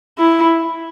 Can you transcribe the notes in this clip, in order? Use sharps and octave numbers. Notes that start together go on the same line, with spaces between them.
E4